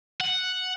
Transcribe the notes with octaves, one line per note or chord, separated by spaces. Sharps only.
F#5